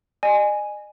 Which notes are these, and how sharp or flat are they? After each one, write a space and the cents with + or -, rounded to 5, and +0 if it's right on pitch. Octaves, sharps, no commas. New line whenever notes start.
D#5 -40 G#5 +0